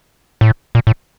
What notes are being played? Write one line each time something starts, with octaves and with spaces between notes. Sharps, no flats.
A2
A#2
A2